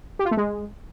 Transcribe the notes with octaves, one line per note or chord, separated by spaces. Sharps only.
G4
F4
A3
G#3